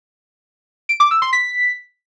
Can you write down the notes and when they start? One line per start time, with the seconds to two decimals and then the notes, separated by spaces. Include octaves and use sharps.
0.89 D7
1.00 D6
1.11 E6
1.22 C6
1.33 B6